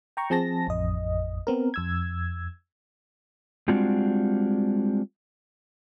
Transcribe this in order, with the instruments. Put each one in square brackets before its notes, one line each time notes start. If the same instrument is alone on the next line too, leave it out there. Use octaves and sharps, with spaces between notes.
[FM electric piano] G5 A#5 C#6
F3 C4 G#4 A5 A#6
A1 F2 D#5
B3 C4 A#4
F2 E6 G#6
[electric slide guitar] G3 G#3 C4 D4 F4 F#4